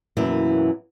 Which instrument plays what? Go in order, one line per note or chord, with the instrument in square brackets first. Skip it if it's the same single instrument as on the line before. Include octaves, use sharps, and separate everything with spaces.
[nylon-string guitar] F#2 B2 E3 A#3 E4